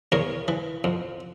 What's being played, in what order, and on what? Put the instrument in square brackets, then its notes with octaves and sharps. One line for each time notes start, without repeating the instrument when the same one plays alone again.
[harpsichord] E2 A#4 C#5
E3
F2